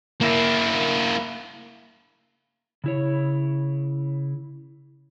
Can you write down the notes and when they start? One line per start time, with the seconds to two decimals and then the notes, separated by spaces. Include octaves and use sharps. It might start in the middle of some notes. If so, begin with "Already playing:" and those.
0.21 A#3 E4
2.84 C#3 E4 C#5